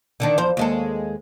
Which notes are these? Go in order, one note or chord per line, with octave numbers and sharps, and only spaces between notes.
D3 D#3 D4
E2 F3 C5
D#2 G#3 A4